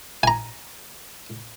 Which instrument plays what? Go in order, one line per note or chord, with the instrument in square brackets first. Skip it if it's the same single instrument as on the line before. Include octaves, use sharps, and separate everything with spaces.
[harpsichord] G#5 A#5